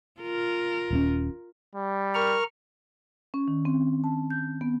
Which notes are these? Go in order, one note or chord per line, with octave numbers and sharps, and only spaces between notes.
F4 A#4
D#1 C4 C#4
G3
A#4 C#6 F6
C#4
D#3
C4
A5
G6
B3